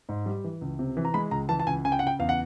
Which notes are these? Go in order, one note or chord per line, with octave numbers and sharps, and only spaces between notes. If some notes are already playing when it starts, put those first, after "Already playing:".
G#2
G3
E3
C#2
C3
E3
A#5
G#3 B5
C#2 A#5
E3 A5
A5
C#2 G#5
C#3 G#5
G5
F#5
C#3 G5
E2 F5
F#5